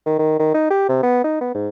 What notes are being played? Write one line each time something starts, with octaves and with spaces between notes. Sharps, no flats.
D#3
D#3
D#3
D#4
G4
C3
B3
D#4
B3
G#2